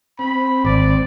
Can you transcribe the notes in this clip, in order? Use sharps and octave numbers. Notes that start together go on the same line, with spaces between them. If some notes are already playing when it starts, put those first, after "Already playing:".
C4 B5
G#1 D5